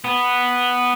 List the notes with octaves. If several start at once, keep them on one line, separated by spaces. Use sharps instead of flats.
B3